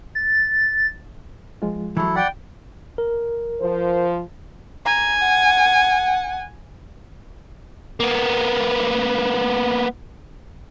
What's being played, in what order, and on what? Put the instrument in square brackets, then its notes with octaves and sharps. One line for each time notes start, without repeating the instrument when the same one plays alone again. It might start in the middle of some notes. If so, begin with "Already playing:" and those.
[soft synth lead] A6
[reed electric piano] F3 G#3 F4
[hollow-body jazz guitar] E3 F#3 [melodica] E4 A4
[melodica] D5 F#5 [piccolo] G5 [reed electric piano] B5
[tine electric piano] A#4
[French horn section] F3 C5
[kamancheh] G#5 [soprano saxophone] A#5
[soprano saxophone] F#5
[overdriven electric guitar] A#3 B3